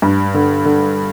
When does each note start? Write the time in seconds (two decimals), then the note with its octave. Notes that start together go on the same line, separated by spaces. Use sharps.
0.02 G2
0.34 D3
0.65 D3